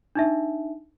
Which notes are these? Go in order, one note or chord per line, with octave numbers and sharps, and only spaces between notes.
D4 D#4 E5